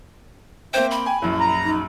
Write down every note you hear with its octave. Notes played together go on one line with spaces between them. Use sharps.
A#3 C4 C5 E5 G5
B5
G5 G#5
A#1 F#2 E4
A#5
D#4